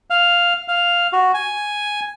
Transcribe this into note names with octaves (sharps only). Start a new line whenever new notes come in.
F5
F5
F#4
G#5